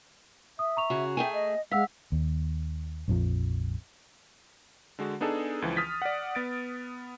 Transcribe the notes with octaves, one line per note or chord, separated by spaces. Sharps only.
E5 D#6
A#5 C#6 F7
C#3 F#4 G#4
A3 G#4 G5 G#5
D#5
G#3 F5 F#5 E6 B6
D#2
A#1 F2 F3
D3 G#3 F#4
B3 D4 D#4 G#4 A4
C#2 E3 F3
D#6 F6 A6 B6
D5 F#5
B3 A6 D7